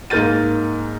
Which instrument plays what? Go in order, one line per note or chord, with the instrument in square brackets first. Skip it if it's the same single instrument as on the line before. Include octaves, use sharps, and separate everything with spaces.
[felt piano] G#2 A#3 A#4 G6 A6 D#7